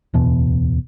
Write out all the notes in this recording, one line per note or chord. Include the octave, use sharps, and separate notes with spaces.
D1 E2 B2